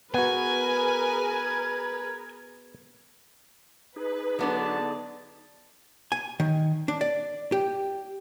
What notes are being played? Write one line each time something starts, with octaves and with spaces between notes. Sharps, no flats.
B3 F#4 G#4 A#4 B4 G#5
D#4 G#4 B4
D3 F#3 B3 D4 D5 A5
G#5
D#3
D4
D5
G4